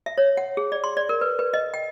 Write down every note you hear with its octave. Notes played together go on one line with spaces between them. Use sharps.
E5
C#5
F#5
G#4
D5
C6
D5
A#4
B4
B4
D#5
G5